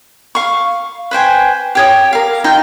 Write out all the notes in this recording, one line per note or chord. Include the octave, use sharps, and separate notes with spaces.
F5 C#6
B4 C5 G5 G#5
G4 C#5 D#6
A#4 F5
D#4 F4 G5